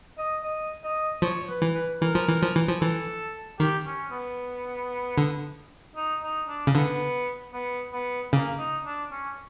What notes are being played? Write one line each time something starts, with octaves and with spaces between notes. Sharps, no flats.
D#5
D#5
D#5
F3 C#5
B4
E3
B4
E3 A#4
F3
E3
F3
E3
F3
E3 A4
D#3 G4
C#4
B3
D3
D#4
D#4
D4
C#3
D3 B3
B3
B3
C#3 A#3
D#4
D4
C#4